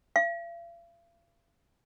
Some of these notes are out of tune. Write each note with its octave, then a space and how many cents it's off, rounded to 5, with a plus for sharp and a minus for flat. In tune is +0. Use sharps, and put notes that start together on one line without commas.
F5 -45